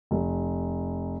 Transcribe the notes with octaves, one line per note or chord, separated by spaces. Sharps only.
F1